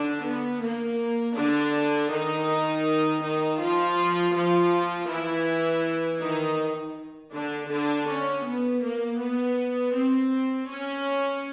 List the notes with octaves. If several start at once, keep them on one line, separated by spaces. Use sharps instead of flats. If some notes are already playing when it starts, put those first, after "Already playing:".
Already playing: D3 D4
B3
A#3
D3 D4
D#3 D#4
D#3 D#4
F3 F4
F3 F4
E3 E4
D#3 D#4
D3 D4
D3 D4
C#4
B3
A#3
B3
C4
C#4